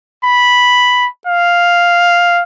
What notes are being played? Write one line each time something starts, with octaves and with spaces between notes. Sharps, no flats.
B5
F5